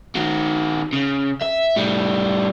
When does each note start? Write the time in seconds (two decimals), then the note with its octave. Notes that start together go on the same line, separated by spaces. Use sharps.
0.16 D#3 F#4
0.93 C#3
1.41 E5
1.76 A2 G3